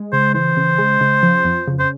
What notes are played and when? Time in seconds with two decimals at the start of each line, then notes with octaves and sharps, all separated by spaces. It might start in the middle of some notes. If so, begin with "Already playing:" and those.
Already playing: G#3
0.13 C#3 C5
0.34 E3 C5
0.57 C#3
0.78 G#3
1.01 C#3
1.23 F3
1.45 F2
1.68 C#3
1.79 C5